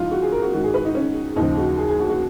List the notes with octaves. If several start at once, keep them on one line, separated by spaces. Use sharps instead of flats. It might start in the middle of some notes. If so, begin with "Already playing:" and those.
Already playing: C#2 C#3 F3 D#4 F4
F#4
G#4
A#4
F#4
G#2 D#3 F#4
G#4
B4
D#4
C#4
D#2 C#3 F3 D#4
F#4
G#4
G#4
F#4
F#4